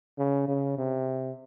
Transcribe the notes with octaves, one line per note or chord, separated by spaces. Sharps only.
C#3
C#3
C3